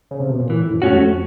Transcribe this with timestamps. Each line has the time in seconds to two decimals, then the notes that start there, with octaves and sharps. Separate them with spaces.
0.11 C#3
0.20 C3
0.30 B2
0.39 A#2
0.50 A2 E3
0.71 F#2
0.82 A3 C#4 F#4
0.92 F2